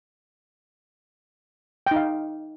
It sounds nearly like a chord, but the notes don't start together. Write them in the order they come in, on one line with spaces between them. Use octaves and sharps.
G5 D#4 F5